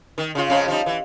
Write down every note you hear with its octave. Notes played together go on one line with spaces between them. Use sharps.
D#3
C#3 F4
F2 C#3 G#3
F3 G3 D#4
E3